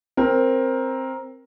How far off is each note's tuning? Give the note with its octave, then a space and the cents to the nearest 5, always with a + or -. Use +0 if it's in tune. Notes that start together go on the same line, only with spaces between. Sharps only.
C4 +10 A#4 +10